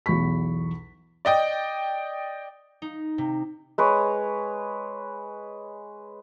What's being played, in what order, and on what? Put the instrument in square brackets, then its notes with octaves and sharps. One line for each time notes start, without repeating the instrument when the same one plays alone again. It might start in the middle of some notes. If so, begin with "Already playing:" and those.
[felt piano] B1 E2 B5 C#6 B6
[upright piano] D5 D#5 G5
[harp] D#4
C3
[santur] G#3 B4 C#5